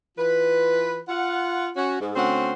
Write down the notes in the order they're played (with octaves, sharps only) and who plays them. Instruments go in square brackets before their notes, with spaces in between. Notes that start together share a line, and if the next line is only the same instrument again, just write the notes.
[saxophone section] E3 F4 B4
F4 F#5
C#4 F#4
G#2
D2 C4 C#4 C5 F#5